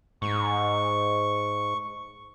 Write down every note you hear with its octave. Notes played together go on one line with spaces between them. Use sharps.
G#2 C#6